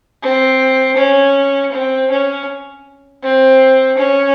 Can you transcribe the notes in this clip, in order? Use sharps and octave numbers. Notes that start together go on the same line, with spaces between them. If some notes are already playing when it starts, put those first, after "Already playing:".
C4
C#4
C4
C#4
C4
C#4